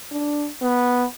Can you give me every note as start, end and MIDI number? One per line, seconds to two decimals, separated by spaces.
0.12 0.46 62
0.62 1.04 59